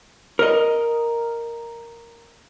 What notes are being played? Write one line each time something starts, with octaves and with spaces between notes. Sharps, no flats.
A#4 D#5